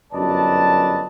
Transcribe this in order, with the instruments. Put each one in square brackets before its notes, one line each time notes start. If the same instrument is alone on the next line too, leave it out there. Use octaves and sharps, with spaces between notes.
[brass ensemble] G1 F#2 B4 D5 D#5 A5